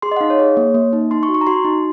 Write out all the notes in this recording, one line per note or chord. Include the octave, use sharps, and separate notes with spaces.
G#4 C6
D#5
F#5
D#4 F5
C#5
G#4
A#3
A#3
D#4
D#4 C6
C#6
F#4
C#6
A#5
F#4 C6
D#4